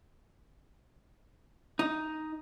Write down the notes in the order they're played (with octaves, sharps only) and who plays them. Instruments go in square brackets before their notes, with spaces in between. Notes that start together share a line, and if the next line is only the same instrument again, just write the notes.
[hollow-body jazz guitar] D#4